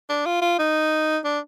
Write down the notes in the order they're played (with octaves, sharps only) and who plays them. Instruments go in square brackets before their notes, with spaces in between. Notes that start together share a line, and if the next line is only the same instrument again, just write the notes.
[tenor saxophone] D4
F4
F4
D#4
D4